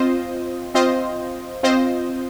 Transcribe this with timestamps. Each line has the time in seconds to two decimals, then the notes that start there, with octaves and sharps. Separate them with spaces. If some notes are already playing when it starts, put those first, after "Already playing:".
Already playing: C4 F4 C5 D#5
0.74 C4 F4 C5 D#5
1.63 C4 F4 C5 D#5